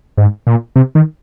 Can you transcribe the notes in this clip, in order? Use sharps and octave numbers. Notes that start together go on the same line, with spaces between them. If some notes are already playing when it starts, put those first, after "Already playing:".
G#2
A#2
C3
D#3